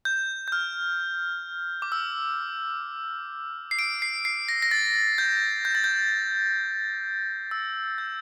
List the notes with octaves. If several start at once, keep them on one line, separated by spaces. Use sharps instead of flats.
G6
G6
F6
D6
E6
C7
D7
C7
C7
A#6
A#6
A6
G6
G6
A6
G6
E6
G6